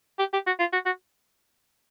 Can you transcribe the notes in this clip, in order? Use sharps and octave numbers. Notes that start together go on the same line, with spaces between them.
G4
G4
F#4
F4
F#4
F#4